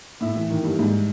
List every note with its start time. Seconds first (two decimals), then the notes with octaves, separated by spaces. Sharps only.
0.21 A2 E5
0.36 E3
0.50 D#3
0.64 G2
0.79 G#2